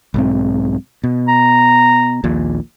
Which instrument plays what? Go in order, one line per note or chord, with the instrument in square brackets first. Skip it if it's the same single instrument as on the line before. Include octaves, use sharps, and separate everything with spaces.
[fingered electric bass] B1 G#2 C4
B2
[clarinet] A#5
[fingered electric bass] A#1 D#2 A#2